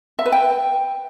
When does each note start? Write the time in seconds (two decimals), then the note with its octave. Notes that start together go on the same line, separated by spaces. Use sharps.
0.19 E5
0.26 B4
0.32 G5